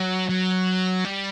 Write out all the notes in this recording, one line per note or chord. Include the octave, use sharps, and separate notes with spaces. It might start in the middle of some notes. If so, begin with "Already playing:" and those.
Already playing: F#3
F#3
G3